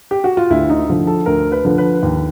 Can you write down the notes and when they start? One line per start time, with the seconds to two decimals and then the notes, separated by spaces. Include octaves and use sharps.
0.11 G4
0.24 F#4
0.37 F4
0.50 D2 E4
0.70 D#4
0.88 D3 F3
1.07 A4
1.26 D2 A#4
1.52 B4
1.65 D3 F3
1.78 B4
2.03 D#2